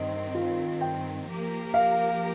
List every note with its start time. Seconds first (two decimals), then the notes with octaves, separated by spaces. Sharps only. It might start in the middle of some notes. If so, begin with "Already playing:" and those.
Already playing: G2 D#3 C4 D#5
0.35 F4
0.81 G5
1.28 F3 A#3 G4 A#4
1.74 F5